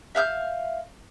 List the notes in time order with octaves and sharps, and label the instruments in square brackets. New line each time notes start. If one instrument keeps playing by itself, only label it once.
[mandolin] E5 F5 E6 G6